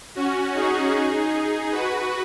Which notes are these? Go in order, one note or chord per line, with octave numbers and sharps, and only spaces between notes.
C#4 F#4
D#4 G#4
F#4 B4